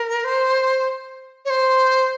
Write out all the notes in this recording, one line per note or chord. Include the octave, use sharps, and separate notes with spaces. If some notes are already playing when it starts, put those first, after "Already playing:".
Already playing: A#4
C5
C#5
C5